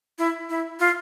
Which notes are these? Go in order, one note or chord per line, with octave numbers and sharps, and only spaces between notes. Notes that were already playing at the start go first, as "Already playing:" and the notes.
E4
E4
F4